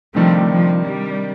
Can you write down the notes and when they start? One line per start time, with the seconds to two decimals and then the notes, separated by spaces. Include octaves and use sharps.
0.15 C3 D#3 F3 G3 A3 D4
0.49 F3
0.85 G3